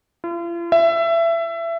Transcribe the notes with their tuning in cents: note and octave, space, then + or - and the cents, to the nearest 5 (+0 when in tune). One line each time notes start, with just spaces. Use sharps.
F4 -45
E5 +25